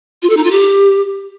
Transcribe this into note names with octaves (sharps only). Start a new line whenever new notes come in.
F4
A4
D#4
F4
G4